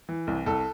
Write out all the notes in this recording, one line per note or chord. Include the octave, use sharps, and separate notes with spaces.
E3
C2
C2 A4